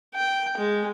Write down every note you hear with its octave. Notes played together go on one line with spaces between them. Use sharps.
G5
G#3